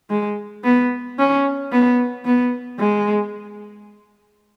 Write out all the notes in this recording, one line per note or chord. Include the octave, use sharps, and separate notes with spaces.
G#3
B3
C#4
B3
B3
G#3